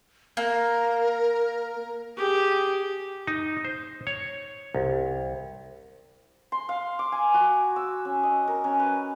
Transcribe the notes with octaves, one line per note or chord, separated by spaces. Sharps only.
A#3 A#4
G4 G#4
D#4
C5
C#5
C2
C6
F5
D6
G#5
F#4
E6
C#4
D#5
A#4
C#4
B4